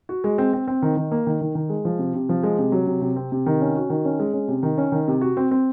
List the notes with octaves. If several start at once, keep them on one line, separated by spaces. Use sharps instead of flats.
F#4
G#3
C4
C4
C4
D#3
D#3
A#3
D#3
D#3
D#3
G#3
F3
C3
C3
F3
G#3
C3
F#3
C3
C3
C4
C3
D#3
C#4
F#4
D#3
C#4
G#3
C#4
C3
D#3
C#4
D#3
C3
F#4
C4
C4